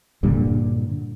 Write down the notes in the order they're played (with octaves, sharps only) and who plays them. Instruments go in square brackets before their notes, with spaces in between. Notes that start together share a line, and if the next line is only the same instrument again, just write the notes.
[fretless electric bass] G2 A#2 D3 G3